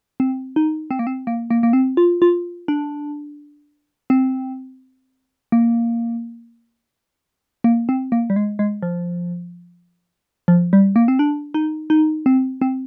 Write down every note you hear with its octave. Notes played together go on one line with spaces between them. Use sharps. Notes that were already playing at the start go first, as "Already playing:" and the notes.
C4
D#4
C4
A#3
C4
A#3
A#3
A#3
C4
F4
F4
D4
C4
A#3
A#3
C4
A#3
G3
G#3
G#3
F3
F3
G3
A#3
C4
D4
D#4
D#4
C4
C4